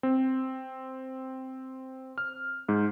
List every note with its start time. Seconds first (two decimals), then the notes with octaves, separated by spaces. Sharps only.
0.03 C4
2.18 F6
2.69 G#2